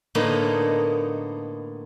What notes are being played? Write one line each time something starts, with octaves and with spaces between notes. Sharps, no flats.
A2 D3 A#3 B3 D#4